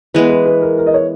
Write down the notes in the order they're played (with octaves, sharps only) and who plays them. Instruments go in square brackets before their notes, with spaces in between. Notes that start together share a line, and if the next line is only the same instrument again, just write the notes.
[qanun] E3 G#3 B3 [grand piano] B4
[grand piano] B4
B4
A#4
A#4
D#5
C#5